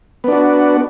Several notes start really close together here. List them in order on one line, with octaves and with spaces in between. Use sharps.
B3 D4 F#4